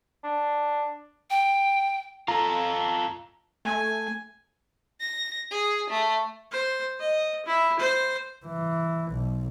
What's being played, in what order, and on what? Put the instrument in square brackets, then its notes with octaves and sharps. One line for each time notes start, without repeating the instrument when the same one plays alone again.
[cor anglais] D4
[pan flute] G5
[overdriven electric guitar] F4 A4 [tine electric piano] A#5
[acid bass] A3 [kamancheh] G#5
[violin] A#6
G#4
A3
[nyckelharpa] C5
D#5
E4
C5
[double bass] E3
B1